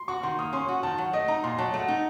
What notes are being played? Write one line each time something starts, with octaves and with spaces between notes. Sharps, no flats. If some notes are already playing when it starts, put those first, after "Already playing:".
Already playing: C6
F#4 C#6
D#3 C6
A#3 D#6
C#4 C6
F#4
D#3 A5
F#3 F#5
A3 D#5
D#4 A#5
A#2 C6
F#3 A5
A3
F#5
D#4